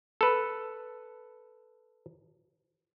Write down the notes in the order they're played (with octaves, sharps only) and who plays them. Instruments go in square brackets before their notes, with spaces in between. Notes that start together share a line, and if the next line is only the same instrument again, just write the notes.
[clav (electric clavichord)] A4 B4